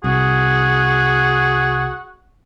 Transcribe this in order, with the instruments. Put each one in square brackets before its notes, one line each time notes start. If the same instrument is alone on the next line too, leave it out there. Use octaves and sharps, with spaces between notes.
[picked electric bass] C2 [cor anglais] F#4 [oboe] G#4